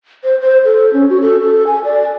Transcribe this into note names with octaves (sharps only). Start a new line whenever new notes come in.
C5
C5
A4
C#4
F#4
A4
A4
G#5
D5